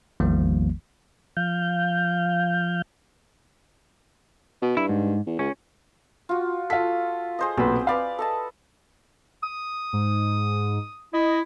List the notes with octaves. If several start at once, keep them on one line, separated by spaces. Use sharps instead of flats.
A1 E2 D#3 F3 G3 A#3
F3 F5 G6
B2
G2 E4
G#2
E2
C#2 C#4
F4 F#4
F4 A4 B6
G#4 C5 D#5
B1 A#2 C4 B4
B4 D5 F5 B5
A4 D#5 A5
D#6
G#2
E4 D#5